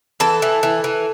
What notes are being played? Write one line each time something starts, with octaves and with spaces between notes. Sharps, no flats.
E3 A4
E3
E3
E3